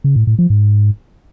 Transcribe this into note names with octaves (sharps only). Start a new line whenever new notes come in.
C#3
A2
A2
F3
G#2